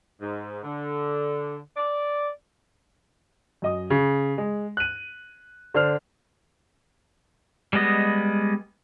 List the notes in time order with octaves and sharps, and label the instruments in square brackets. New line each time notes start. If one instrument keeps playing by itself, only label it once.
[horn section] G#2
D3
D5
[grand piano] F#2 D#5 D#6
C#3
G#3
F#6 D#7
D3 D4 C5 F6
[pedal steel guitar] G3 G#3 B3 D#5